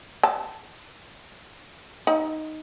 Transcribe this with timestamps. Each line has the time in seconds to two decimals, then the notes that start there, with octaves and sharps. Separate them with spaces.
0.23 A5
2.07 D#4